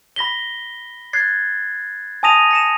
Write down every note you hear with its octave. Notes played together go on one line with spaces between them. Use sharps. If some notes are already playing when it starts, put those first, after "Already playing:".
B5 A#6 B6 G7
F#6 G#6 A6 C7
G#5 A5 D#6 A#6 D#7 F7
A#6 C#7 E7